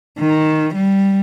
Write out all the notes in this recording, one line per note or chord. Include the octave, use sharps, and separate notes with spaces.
D#3
G3